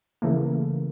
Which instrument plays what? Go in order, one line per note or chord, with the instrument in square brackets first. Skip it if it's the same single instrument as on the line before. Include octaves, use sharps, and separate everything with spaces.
[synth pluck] C#3 E3 A3 A#3